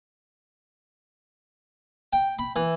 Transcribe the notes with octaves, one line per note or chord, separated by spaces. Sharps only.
G5
B5
E3